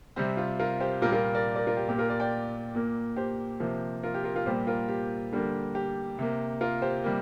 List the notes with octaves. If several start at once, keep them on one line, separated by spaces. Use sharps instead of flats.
C3 G3 C4 G4
F4
F4 A#4
G4 C5
A#2 G3 A#3 F4 A#4
F4 A#4
A#4 D5
A#4 D5
F4 A#4
G4
A#2 A#3 G4
F4 A#4
A#4 D5
D5 G5
A#2 A#3
G4 C5
C3 F3 A#3
F4 A#4
G4
F4 A#4
F4 A#4
A#2 G3 A#3 G4 C5
F4 A#4
G4
D3 G3 A#3
G4
C3 A#3
F4 A#4
G4 C5
C3 G3 A#3